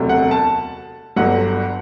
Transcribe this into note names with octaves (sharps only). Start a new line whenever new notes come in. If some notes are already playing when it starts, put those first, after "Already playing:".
Already playing: E1 D2 C3 F#3
F#5
A5
G1 G2 F#3 F#5